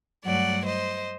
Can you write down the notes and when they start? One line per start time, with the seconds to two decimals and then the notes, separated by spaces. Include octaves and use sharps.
0.24 G2 F#3 A3 D5 F#5
0.65 C5 D#5